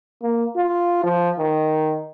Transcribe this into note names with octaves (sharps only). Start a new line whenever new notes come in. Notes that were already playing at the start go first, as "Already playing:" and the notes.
A#3
F4
F3
D#3